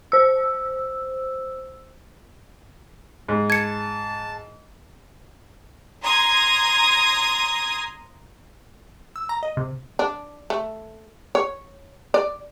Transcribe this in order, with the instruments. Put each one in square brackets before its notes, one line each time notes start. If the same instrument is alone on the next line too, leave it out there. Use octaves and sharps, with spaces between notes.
[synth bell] C5 E6
[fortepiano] G#2
[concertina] A5 [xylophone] G#6 C#7
[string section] A#5 C6 D#6 G#6
[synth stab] E6
A#5
D#5
C3
[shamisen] D4
A3
C#5
D5